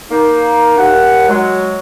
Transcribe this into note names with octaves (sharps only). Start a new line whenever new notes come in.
A#3 D#4
D#2 F#5
F#3 G#3